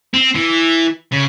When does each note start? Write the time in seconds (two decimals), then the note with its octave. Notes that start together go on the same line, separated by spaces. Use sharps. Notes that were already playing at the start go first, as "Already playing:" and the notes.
0.14 C4
0.35 E3
1.12 C#3